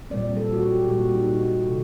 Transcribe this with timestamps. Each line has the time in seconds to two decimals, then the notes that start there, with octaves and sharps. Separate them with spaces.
0.10 A#2 G3 C4 D5
0.37 A4
0.53 F#4
0.63 G4
0.88 A#2 G3 C4 F#4
1.15 D#4
1.40 F#4
1.66 C3 D#3 A4